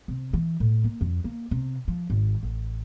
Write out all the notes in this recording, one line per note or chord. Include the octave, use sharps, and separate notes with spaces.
C3
E3
A2
A#3
F2
A#3
C3
F3
G#1
A1